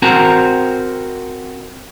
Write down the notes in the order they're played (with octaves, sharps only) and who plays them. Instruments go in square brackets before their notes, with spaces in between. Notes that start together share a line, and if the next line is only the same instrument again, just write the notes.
[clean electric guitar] C4 F#4 A#4 A#5